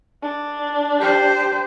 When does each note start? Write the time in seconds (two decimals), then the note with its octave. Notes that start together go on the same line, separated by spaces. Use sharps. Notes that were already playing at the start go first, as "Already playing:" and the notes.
0.23 D4
0.99 G4 C5